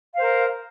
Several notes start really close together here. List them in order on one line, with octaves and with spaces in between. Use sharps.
F5 C5 A#4